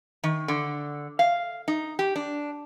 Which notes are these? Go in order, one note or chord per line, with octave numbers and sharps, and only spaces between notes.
D#3
D3
F5
D#4
G4
D4